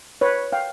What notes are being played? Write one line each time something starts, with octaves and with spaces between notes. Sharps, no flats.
B4 C#5
F5 G5